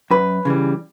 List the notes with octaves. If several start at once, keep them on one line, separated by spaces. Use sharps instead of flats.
F#2 B4
C#3 E3 G3